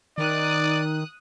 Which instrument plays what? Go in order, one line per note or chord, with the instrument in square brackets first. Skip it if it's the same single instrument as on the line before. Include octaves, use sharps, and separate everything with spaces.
[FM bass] D#3 [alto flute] D#4 [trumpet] D5 [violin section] D#6 F#6